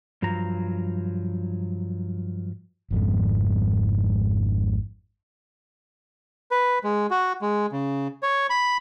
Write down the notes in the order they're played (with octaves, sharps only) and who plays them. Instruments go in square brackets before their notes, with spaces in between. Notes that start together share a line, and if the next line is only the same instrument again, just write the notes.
[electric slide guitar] G2 F3 F#3 A#5
[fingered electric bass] G#1 F2 G#2
[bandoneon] B4
G#3
F#4
G#3
C#3
C#5
B5